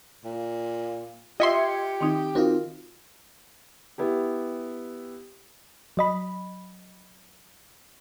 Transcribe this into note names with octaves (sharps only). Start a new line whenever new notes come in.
A#2
F4 G4 D#5 E5 C6 G#6 C#7
D#3 C4 D#4
C4 D#4 F4 F#4 A#4
B3 E4 G4
F#3 D#5 B5